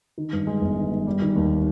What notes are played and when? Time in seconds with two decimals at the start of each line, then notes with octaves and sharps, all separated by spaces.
0.18 D#3
0.33 G2
0.47 G#3
0.61 G1
0.77 D#3
0.91 G2
1.07 G3
1.22 D#3
1.36 D#2